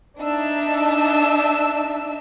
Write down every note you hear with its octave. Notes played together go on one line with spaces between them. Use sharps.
D4 D#4 E5 E6